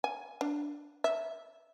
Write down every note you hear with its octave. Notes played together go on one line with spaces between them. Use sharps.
G#5
D4
E5